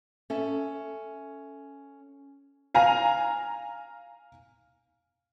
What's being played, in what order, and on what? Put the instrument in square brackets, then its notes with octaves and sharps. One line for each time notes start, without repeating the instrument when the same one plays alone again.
[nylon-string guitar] C#4 A4 E5
[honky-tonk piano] F5 G#5 A#5